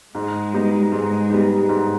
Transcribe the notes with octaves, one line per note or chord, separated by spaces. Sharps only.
G#2 G#3
G3 B3 D#4
G#2 G#3
G3 B3 D#4
G#2